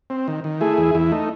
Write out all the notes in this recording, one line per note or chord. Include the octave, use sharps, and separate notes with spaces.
C4
D#3
D#3
A3 E4 G#4
E2
E2 E4
A3 D#4